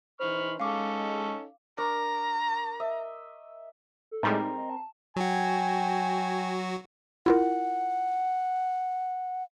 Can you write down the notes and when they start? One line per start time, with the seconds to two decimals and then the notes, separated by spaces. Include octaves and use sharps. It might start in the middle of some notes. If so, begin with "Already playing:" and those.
0.20 E3 D#4 C5 B5 C#6 F6
0.60 G#3 C#4 D#4 A4 F5 D6
1.78 D4 A#4 A#5 C#6
2.80 D#5 E5
4.11 A4
4.23 A2 G3 G#3 C4 D#4 A#4
4.57 D#5
4.70 A5
5.16 F#3 F#4 G5 G#5
7.26 E4 F4 A#4 F#5